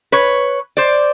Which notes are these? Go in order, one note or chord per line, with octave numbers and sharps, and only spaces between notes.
B4 C#5
C5 D5